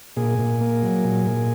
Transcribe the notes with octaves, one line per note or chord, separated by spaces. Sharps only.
A#2 G#4
A#2
A#3
F#3
A#2
A#2